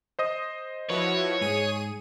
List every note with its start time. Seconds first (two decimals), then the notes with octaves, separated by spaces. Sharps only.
0.19 C5 D#5 D#6
0.90 F3 E4 F#4 B4 C#5
1.41 G#2 G#4 D#7